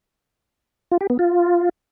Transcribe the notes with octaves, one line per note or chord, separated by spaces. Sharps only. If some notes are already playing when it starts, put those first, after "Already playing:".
F4
G4
B3
F4